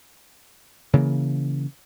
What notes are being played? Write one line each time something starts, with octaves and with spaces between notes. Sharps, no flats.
C#3 E3 A#3